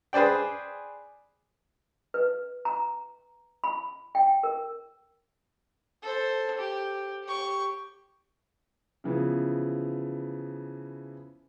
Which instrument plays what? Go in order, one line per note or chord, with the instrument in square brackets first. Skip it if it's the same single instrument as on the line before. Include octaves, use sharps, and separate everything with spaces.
[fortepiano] G#4 B4 C5 D5 G5
[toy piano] B4
A#5
B5
G5
A#4
[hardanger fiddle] A4 C5
G4
G4 C#6
[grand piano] C#3 E3 F3 B3